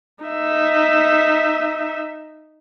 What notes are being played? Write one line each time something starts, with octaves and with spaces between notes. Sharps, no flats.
D#4 E5